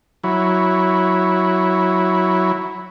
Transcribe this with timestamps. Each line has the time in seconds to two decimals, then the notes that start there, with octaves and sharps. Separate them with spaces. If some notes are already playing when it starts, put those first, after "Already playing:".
0.24 F#3 E4